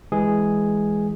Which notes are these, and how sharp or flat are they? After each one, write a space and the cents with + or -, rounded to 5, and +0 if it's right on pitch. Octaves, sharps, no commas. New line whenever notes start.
E3 +0 G#3 +0 G#4 +0